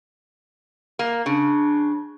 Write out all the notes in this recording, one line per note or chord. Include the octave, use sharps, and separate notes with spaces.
A#3
C#3 D4